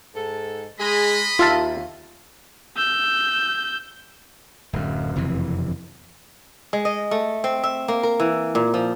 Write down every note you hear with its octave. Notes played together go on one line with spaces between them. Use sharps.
G#2 A4
G#3 G#4 D#5 B5
D#2 F4 E5 F5 A5
E6 G6
D1 F#2
F#1 F2 C3 E3
G#3
D#5
A3
C4
E5
A#3
A#4
E3
A#2
F3